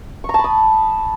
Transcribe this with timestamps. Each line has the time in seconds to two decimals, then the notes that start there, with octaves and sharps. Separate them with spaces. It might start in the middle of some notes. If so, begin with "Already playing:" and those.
0.24 C#6
0.29 A#5
0.34 A5
0.39 B5
0.44 D#6